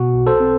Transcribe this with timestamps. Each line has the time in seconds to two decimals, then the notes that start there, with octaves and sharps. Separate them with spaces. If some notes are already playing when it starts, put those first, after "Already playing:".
Already playing: B2 F#4
0.14 B1
0.27 A4 C5
0.40 C4